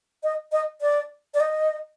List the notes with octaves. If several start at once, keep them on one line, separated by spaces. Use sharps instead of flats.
D#5
D#5
D5
D5
D#5